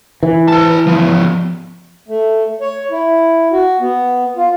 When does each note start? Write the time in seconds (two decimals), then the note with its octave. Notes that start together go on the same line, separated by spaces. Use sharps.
0.23 E3
0.48 A#4 A5
0.86 F3 B3
2.08 A3
2.61 C#5
2.91 E4
3.52 F#4
3.80 B3
4.36 F4